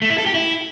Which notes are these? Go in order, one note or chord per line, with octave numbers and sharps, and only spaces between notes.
A3
E4
A4
G4
E4